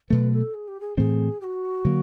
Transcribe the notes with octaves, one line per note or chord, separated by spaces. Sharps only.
B2 F#3 A3 B4
A4
G#4
G4
G#4
A2 E3 A3 C4 G#4
G4
F#4
D3 F#3 A#3